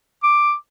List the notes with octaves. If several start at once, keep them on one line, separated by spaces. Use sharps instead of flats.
D6